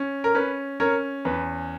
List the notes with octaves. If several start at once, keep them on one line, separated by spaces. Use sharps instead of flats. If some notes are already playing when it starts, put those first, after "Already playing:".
Already playing: C#4
A#4
C#4 B4
C#4 A#4 C#5
E2 B4